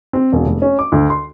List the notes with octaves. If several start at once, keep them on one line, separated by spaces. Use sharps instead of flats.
C4
E1
F1
C#4
D6
D2
C6